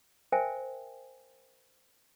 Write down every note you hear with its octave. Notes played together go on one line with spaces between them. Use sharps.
A#4 C5 E5 G5 G#5